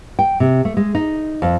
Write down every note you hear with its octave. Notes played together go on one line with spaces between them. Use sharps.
G5
C3
A3
G#3
D#4
F2